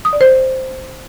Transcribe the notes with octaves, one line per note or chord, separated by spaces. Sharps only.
D#6
D5
C5